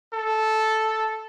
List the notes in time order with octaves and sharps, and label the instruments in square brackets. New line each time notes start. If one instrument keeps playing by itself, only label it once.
[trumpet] A4